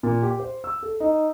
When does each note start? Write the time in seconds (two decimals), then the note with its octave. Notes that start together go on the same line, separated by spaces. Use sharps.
0.03 A#2
0.22 G4
0.40 C5
0.64 E6
0.83 A4
1.00 D#4